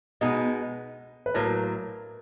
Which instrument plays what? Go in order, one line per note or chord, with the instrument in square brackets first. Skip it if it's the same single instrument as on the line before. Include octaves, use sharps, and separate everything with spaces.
[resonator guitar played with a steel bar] B2 G#3 B3 D#4 [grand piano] D#5
[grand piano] B4
[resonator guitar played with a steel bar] A2 F#3 A#3 [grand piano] A#4